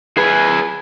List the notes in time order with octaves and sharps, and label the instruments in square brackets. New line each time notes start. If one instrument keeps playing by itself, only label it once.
[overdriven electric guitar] G#4 B4